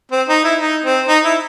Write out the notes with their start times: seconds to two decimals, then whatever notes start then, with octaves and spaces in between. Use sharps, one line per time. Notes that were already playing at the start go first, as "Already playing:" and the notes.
0.12 C4
0.28 D#4
0.44 E4
0.60 D#4
0.84 C4
1.08 D#4
1.25 E4